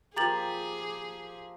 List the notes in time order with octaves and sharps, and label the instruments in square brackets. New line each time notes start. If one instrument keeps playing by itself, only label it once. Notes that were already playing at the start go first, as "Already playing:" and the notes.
[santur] F3 A#3 G4 [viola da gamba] G#4 [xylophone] A#5 A6 F#7